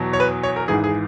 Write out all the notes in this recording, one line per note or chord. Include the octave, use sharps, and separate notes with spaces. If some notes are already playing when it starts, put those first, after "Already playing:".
Already playing: E2 B2 F#3
C#5
B4
C#5
A#4
G#1 G#2 E3 G#4
G#4